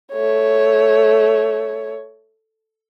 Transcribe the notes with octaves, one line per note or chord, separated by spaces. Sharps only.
A3 C#5